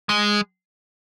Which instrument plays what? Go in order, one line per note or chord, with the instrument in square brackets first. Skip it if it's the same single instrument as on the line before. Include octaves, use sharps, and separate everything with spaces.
[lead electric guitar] G#3